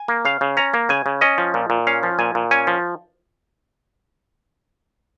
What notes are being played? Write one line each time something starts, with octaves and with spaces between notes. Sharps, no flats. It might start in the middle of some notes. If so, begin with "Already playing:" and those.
Already playing: G#5
A#3
C#3 F5
C#3
C#4 A#5
A#3
C#3 G#5
C#3
C#4 D#5
F3
A#2
A#2
C#4 F5
F3
A#2 G#5
A#2
C#4 G#5
F3